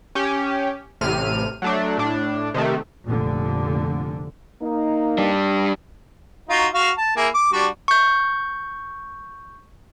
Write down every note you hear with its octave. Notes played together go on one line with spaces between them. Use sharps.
C#4 G4
A1 A2 C3 F6 D#7
F#3 A3 D4
A2 D4
C3 D#3 A3
F1 A#2 D3
A#3 D#4
G3 D4
D#4 F4 F#4
F#4 F5
A5
A#3 E4 G#4
D6
G3 D4 F#4
C#6 G6